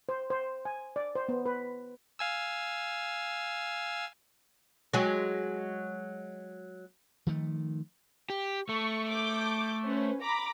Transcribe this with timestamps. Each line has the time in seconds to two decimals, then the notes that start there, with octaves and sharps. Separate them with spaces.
0.09 C5
0.30 C5
0.65 G#5
0.96 D5
1.15 C5
1.29 B3
1.46 B4
2.19 F5 G#5 E6
4.93 F#3 G#3
7.27 D#3 F3 A3
8.30 G4
8.69 A3 C#6
9.09 D6 G6
9.83 C#4 B4 C5
10.20 A#5 B5 D6